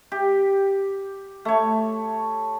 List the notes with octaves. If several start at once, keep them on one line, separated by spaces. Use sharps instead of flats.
G4
A3 C#5